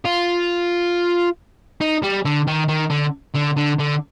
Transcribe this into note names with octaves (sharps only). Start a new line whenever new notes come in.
F4
D#4
G3
D3
D#3
D#3
D3
D3
D3
D3